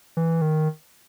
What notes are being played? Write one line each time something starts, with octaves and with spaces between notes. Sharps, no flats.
E3
D#3